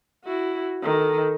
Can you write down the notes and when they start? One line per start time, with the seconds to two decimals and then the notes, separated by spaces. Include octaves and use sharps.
0.24 E4 F#4
0.82 D#3 A4